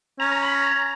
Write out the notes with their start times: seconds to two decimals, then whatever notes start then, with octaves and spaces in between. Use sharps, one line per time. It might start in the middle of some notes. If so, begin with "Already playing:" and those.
0.20 C#4 A#5
0.31 A#5
0.43 B5
0.54 A#5